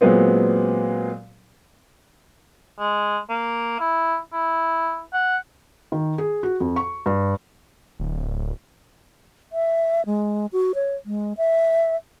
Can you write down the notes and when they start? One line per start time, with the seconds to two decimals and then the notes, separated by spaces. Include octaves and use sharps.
0.01 A#2 F#3 G#3 B3 C4
2.79 G#3
3.29 A#3
3.80 E4
4.33 E4
5.13 F#5
5.92 D#3
6.18 G#4
6.43 F#4
6.60 F2
6.76 C#6
7.06 G2
7.99 D1
9.52 E5
10.06 G#3
10.53 F#4
10.75 C#5
11.06 G#3
11.37 E5